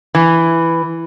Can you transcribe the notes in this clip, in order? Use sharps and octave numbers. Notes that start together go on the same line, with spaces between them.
E3